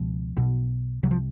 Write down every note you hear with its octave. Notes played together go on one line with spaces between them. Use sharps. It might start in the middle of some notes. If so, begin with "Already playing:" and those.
Already playing: C#2 B2 F3
B1 B2
C2 C3 F#3
F3